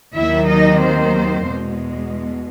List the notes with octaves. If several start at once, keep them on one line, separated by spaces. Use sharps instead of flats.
D#2 D#3 F#3 A#3 E4 E5
D#4 D#5
C4 C5
E2 B2 G#3